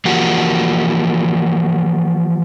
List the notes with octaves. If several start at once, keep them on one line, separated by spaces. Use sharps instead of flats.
E3 F3 A#3 F#4 G4